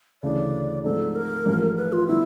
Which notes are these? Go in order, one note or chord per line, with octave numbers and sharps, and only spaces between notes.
D2 C#3 E3 A3 D5
G#2 F3 A3 C4 D#4 A4
A#4
A1 G#2 F3 A3
B4
F4
D3 G3 B3 E4